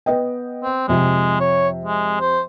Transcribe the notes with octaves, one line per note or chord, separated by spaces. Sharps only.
B3 D#5 G5
C4
F2 C3 G#3
C#5
G#3
C5